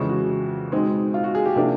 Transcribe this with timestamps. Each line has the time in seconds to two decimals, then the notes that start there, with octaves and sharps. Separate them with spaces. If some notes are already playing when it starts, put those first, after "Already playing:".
Already playing: F2 C#3 E3 G#3
0.09 F#4
0.72 B2 G#3 C4 D#4
1.14 F4
1.24 F#4
1.35 G#4
1.45 G4
1.56 C3 F3 A#3 D4